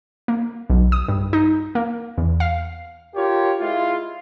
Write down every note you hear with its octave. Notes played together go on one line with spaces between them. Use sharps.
A#3
B1
D#6
G2
D#4
A#3
E2
F5
F4 G4 A#4 C#5
G#3 E4 F4